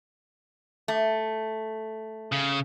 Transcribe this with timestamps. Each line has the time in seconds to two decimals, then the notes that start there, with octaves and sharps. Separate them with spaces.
0.88 A3
2.32 C#3